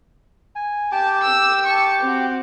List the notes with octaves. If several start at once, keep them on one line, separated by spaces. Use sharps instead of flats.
G#5
G4 G5 A5 D6
E6
A5 C#6
C4 F#4